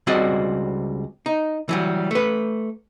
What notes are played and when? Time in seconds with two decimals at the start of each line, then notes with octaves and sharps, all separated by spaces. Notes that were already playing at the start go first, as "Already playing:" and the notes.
0.07 C#2 G3 C4 F#4 D5 D#5
1.26 D#4
1.69 E3 F#3 G3
2.11 A3 B4